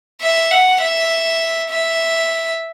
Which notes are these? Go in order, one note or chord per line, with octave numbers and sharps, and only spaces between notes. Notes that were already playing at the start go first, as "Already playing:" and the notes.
E5
F#5
E5
E5